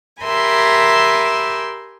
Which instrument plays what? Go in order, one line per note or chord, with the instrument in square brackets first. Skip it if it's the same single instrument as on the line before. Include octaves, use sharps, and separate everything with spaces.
[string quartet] G4 A#4 E5 G#5 B5 C6